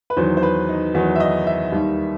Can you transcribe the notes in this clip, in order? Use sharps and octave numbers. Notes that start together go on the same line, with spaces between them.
B4
E2 D#3 F#3 C5
C5
B4
D#4
E2 D#3 F#3 F#4
E5
D#5
E5
D#2 D#3 G3